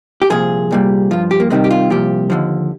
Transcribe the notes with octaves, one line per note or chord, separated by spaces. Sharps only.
G4
C2 A#2 F3 G#4
C2 A#2 G3
G2 F3 F4
G4
A#3
C2 C3 D#3 G3 G#3
G4
F4
C2 A#2 F3 G4
D#2 D3 F3